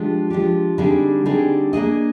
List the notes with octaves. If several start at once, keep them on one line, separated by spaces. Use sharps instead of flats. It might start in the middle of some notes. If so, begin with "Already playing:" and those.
Already playing: F3 G#3 D4 G4
F3 G#3 D4 G4
D3 G3 C4 D#4 G#4
D3 G3 C4 D#4 G#4
A#3 D4 G#4 D#5